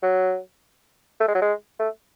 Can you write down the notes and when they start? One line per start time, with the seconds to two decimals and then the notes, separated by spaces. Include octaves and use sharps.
0.03 F#3
1.20 A3
1.28 G#3
1.35 F#3
1.42 G#3
1.79 A3